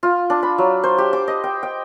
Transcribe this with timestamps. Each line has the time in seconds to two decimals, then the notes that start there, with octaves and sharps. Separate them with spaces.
0.03 F4
0.30 D4
0.43 B5
0.58 F#3
0.84 C5
0.98 G4
1.13 D6
1.28 D#5
1.44 G5
1.63 G5